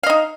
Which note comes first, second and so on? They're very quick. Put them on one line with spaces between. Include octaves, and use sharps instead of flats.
F5 D#5 D#4